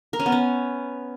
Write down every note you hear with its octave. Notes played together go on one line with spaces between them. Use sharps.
A#4
C#4
B3
C#4